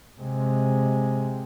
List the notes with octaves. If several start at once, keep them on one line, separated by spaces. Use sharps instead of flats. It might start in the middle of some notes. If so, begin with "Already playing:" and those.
C3 G#3